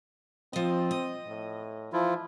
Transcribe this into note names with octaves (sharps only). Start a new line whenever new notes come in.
F3 C4 D#5
D#5
A2
E3 F3 E4 F4